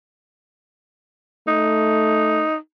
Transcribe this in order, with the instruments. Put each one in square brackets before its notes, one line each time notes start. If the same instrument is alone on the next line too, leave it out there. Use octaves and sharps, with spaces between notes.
[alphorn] A3 [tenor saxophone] D#4